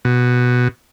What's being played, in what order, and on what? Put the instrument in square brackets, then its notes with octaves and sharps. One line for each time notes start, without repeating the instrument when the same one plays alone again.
[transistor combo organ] B2